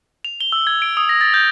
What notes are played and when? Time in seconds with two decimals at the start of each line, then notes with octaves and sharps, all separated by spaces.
0.25 F7
0.41 G7
0.52 E6
0.67 G#6
0.82 D7
0.97 D#6
1.09 A#6
1.21 A6
1.34 G6